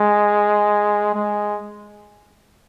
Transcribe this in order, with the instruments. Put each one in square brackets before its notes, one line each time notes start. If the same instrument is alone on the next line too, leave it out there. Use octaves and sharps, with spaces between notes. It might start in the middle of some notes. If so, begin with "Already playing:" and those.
Already playing: [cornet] G#3
G#3